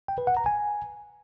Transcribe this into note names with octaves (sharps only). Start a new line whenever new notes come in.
G5
B4
F#5
A#5
G#5